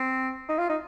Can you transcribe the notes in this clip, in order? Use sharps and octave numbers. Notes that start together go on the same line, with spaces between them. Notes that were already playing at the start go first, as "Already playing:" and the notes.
Already playing: C4
D#4
F4
D#4